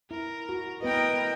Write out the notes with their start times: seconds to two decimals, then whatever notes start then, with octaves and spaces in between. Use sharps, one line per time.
0.11 E4 A#4
0.49 F#4
0.83 B3 E4 A#4 B4 D#5 G5